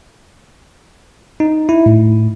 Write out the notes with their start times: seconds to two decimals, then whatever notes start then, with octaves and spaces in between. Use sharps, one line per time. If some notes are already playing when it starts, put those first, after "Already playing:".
1.40 D#4
1.69 E4
1.86 A2